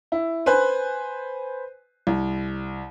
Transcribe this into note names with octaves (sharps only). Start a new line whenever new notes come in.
E4
B4 C5 G#5 F#6
C2